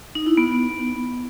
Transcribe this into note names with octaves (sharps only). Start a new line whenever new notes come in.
D#4
E4
B3